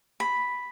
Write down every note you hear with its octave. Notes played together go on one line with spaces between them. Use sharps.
B5